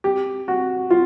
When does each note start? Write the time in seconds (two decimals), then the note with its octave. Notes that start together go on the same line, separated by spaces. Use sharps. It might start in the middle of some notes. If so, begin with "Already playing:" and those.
0.04 G4
0.48 F#4
0.90 F4